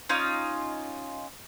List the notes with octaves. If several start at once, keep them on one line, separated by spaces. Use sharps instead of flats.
C#4 D#4 F4 D#6